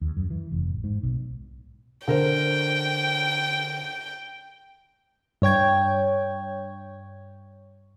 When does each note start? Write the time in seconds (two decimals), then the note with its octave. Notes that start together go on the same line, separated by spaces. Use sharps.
0.01 D#2
0.17 F#2
0.30 E3
0.52 F1
0.71 A1
0.84 G#2
1.03 B1
2.08 D3 A#4 C5 G5
5.42 G2 C#5 G5 G#6